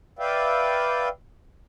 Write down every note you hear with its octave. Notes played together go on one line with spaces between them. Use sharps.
B4 D5 E5 F5 G5